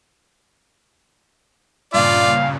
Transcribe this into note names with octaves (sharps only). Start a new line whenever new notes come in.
G2 A#2 C#3 F4 D5 F5